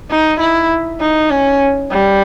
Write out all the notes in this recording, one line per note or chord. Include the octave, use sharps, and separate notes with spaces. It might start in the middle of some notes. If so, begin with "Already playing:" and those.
D#4
E4
D#4
C#4
G3